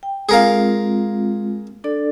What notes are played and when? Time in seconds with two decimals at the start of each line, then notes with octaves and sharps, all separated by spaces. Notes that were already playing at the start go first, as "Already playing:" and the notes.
0.03 G5
0.29 G#3 C4 F4 G#4 A#4 F5
1.84 D4 A4 D5